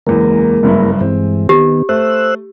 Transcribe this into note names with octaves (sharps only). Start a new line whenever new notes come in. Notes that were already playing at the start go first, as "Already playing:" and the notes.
F#1 E2 G#3 A#3 A#4
F#1 G2 E4
G2 E3 G#3 C4
D#3 B3 G4
A3 C5 E6 F#6